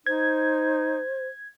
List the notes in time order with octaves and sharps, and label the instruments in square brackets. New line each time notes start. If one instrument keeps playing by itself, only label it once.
[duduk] D#4 [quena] C5 [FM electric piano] G#6